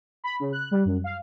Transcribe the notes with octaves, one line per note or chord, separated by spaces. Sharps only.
B5
C#3
F#6
G3
F#2
F5